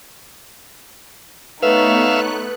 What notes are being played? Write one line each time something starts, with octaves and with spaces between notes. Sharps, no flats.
A3 B3 D#4 B4 C#5 E5 F5 F#6